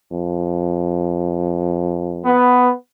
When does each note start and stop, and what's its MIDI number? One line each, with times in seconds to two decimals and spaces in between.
0.11 2.38 41
2.24 2.71 59